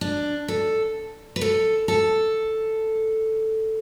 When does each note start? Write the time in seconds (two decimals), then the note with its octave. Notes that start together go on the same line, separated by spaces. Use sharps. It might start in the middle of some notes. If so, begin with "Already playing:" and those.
0.01 D4
0.48 A4
1.36 B4
1.41 A4
1.88 A4